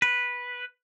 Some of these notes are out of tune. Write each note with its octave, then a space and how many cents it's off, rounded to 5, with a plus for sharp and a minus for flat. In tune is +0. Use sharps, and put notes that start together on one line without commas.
B4 -5